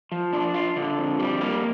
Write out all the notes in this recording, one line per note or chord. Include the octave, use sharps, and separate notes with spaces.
F3
D4
F4
D3
F2
G3
A#3